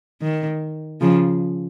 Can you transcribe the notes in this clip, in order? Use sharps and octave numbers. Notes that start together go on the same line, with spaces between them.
D#3
C#3 F3